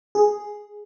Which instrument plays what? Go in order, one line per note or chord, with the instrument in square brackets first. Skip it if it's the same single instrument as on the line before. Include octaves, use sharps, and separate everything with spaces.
[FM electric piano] G#4